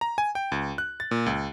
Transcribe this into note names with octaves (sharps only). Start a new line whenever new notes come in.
A#5
G#5
G5
C#2
F#6
A6
A#2
C#2